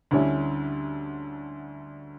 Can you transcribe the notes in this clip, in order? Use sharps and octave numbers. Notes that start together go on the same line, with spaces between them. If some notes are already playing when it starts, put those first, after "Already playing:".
D2 D3 G3 C#4 E4